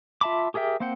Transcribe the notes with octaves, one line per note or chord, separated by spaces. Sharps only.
F4 E5 A5 B5 D6
G4 G#4 A#4 E5 G5
A#3 C4 C5 F#5 G5